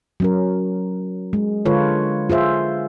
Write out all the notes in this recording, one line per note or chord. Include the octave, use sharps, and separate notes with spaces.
F#3 C#4 A#4
G#3
D3 G#3 F4 A4 B4 C#5
F4 G#4 C5 E5